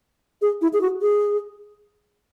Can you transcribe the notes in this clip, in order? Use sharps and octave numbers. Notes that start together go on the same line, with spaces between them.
G#4
E4
G#4
F#4
G#4